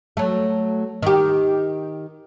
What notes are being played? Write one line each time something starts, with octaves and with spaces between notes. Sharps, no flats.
F#3 A3
D#3 G4